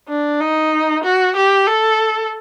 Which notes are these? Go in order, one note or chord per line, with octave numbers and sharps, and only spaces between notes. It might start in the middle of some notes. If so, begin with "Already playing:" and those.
D4
D#4
F#4
G4
A4